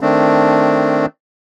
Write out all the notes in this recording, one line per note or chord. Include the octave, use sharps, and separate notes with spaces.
D#3 A3 C4 D4